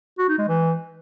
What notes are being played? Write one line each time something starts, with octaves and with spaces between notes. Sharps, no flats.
F#4
D#4
G#3
E3